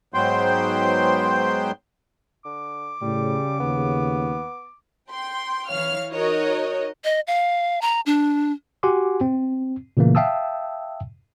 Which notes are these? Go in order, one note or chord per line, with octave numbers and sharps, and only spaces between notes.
G#2 F#3 B3 C5 G5 C6
D3 D6
A2 C#3 G3
D#2 B3
G5 C6
E3 C#5 F5 F6
D#4 F#4 A#4 C#5 D#5
D#5
F5
A#5
D4
F#4 G4 F#5 G#5 C6 D6
C4
A#2 C#3 E3 A3 A#3
E5 F5 G5 A5 D#6 E6